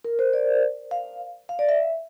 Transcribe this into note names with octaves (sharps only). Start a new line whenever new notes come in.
A#4
C5
D5
F5
F5
D5
E5